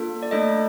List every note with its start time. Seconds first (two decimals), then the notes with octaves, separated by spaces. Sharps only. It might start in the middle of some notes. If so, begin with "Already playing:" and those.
Already playing: A#3 D4 F4 A4
0.23 D5
0.31 A3 D4 A4 D#5